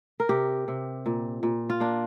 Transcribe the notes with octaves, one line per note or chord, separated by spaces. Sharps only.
A#4
C3 G4
C3
A#2
A#2
F4
A#3 D4